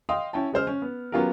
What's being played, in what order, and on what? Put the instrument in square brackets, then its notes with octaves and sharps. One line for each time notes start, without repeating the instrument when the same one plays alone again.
[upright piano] D#5 F5 G5 C6 D#6
C#4 E4 G5 A5
C#3 G#3 C5 F6
C#4
B3
F#3 B3 C#4 F4 G4 A#4